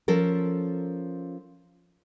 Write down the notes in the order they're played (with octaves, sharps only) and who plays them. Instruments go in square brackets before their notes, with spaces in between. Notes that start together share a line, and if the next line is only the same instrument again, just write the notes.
[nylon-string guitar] F3 C#4 A4 A#4